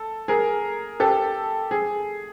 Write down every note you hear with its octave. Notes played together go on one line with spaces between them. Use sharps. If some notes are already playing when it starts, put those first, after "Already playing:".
Already playing: A4
G#4 A#4
G4 A4
G#4